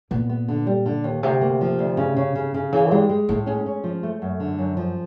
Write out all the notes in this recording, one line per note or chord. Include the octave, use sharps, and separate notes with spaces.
A#2 B3
B3
D3
G3
D3
D#2
D2 C3
A#3
F3
D2
C#3
C#3
C#3
C#3
C#3 E3
G3 G#3
G#3
A2 A3
G#3 C#4
C#4
F3
A3
F#2
D3
F#2
F3